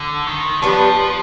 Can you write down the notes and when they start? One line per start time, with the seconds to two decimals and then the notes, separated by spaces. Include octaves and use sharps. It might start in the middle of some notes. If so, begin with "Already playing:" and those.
Already playing: D3
0.27 D#3
0.62 F3 G3 B3 D4